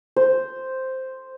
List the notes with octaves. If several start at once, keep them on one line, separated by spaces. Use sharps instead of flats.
C5